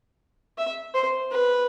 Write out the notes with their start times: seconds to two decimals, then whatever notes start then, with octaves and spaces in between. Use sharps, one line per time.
0.58 E5
0.94 C5
1.31 B4